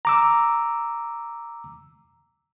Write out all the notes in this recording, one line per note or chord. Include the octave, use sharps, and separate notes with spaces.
A#5 D6 E6